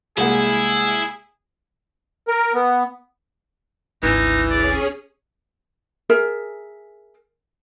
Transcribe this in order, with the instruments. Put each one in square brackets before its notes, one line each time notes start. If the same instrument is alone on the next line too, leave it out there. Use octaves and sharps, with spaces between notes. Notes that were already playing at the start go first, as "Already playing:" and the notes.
[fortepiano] C2 A#3 F#5 [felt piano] G#3 [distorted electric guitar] E4 [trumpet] G#4
[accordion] A#4
B3
[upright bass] G#1 D2 [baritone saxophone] E3 [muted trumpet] D#4
[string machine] C#4 G#4 [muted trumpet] D5
[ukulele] G#4 A#4 E5